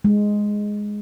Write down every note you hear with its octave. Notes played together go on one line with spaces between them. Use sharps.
G#3